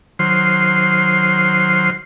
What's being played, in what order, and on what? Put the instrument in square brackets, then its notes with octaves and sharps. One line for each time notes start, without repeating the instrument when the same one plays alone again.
[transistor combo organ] D#3 F#3 C5 C6 F6